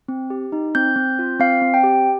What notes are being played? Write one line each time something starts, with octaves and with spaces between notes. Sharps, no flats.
C4
G4
D#4
C4 G6
C4
F4
C4 F5
C4
G5
G4